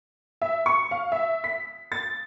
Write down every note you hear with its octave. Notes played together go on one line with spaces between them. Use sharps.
E5
C#6
F5
E5
B6
A6